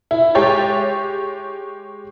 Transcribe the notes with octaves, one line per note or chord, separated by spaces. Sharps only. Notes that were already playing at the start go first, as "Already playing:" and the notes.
E4
G#3 G4 C#5 A6